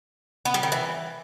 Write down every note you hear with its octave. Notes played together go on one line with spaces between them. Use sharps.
B3
G3
D#3
E3